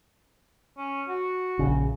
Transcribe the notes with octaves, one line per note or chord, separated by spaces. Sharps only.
C#4
F#4
A#1 C#3